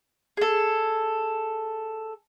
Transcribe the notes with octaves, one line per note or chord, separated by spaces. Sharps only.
G#4 A4